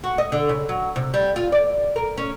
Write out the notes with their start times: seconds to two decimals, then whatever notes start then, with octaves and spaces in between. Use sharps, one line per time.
0.04 F#4
0.18 D#5
0.32 D3
0.49 C#3
0.69 F#3
0.96 C3
1.14 G3
1.36 F4
1.52 D5
1.96 A#4
2.18 C#4